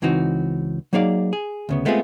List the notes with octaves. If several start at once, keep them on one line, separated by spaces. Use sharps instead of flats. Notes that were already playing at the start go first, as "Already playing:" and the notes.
C#2 E3 C4 D#4 F#4
F#3 A#3 D#4 G#4 D5 F5
G#4
D2 C#3 B3
G#3 A3 B3 C4 F4 G#4